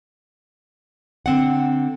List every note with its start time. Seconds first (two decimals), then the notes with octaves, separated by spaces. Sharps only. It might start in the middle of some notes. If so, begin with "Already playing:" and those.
1.26 D3 C4 F#5